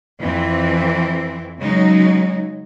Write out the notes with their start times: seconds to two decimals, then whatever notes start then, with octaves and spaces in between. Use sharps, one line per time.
0.19 F2 E3 C4
1.59 C#3 F#3 G#3 D#4